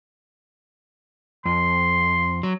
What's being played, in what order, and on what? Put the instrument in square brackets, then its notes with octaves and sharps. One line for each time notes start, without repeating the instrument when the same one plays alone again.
[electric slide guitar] F2 [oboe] C6
[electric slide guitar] F#3